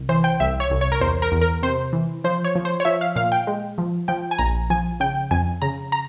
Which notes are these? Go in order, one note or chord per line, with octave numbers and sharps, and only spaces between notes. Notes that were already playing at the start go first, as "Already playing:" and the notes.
Already playing: C2
E3 C5
G5
C2 E5
C#5
C2
C#5
A#4
E2 C5
A#4
E2
A#4
C3 C5
E3
F3 C5
C#5
F3
C5
C#5
F3 E5
F5
A#2 F5
G5
G#3
F3
F3 G5
G#5
A#1 A#5
F3 G#5
C#3 G5
F2 G#5
C#3 A#5
A#5